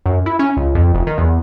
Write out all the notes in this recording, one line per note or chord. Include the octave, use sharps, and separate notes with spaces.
F#2
E4
C#4
C#2
F2
F1
D#3
E2